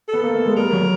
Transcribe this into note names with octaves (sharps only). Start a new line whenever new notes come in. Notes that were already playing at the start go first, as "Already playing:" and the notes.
A4
B3
A#3
A3
G#3
G3 A#4
F#3